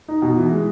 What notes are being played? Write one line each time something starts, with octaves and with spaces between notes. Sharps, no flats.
D#4
B2
E3
G#3